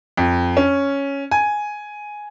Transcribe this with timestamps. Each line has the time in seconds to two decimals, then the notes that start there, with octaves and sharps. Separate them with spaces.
0.17 F2
0.57 C#4
1.31 G#5